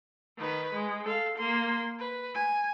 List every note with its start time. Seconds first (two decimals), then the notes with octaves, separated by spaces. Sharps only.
0.38 D#3 B4
0.73 G#3
1.04 A4 F5
1.38 A#3 C6
1.99 B4
2.35 G#5